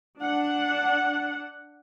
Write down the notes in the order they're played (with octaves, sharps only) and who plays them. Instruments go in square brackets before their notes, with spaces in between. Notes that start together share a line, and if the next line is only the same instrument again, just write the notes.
[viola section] D4 F#5